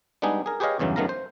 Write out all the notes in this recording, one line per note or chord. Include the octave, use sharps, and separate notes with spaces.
G3 G#3 B3 D4 D#4 G#4
G#4 A#4
G4 G#4 B4 C#5 D#5 F5
E2 G2 C#3 E3 F#3
F#2 D#3 A3 B3 F5 A#5
C5